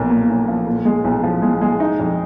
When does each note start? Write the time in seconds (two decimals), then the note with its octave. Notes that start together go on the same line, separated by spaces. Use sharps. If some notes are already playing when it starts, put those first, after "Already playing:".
Already playing: B1 F3 A#3
0.10 A#2
0.29 B1
0.48 F3
0.67 A#2
0.85 G#3
1.05 B1
1.23 F3
1.42 G#3
1.62 G#3
1.80 D#4
1.99 F2